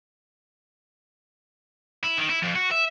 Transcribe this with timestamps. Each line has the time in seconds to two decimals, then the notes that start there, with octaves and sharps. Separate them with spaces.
2.04 E4
2.18 D#3
2.30 E4
2.43 F2
2.56 F#4
2.72 E5